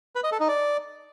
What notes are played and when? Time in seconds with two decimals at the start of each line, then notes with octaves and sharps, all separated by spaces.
0.16 B4
0.24 D#5
0.32 A4
0.40 D#4
0.48 D5